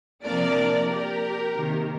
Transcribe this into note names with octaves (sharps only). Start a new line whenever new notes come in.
C3 F3 A#3 D4 A#4 D5
G4 A#4
C3 D#3 A#3